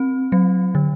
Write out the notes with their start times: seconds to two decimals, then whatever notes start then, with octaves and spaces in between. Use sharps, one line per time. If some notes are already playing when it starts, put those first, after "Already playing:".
Already playing: C4
0.32 F#3
0.75 D3